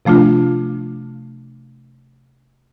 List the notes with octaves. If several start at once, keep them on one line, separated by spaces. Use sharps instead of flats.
C3 F3 A3 D4 F4